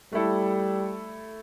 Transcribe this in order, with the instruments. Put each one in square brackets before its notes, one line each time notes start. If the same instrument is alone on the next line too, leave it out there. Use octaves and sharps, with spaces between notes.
[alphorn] G3 [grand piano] A3 E4 A4